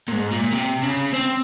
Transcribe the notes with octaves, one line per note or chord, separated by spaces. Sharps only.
A#2
G#2
A#2
C3
C#3
C4